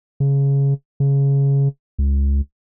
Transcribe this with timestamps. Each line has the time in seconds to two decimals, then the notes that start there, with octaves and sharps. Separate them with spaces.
0.20 C#3
1.00 C#3
1.99 C#2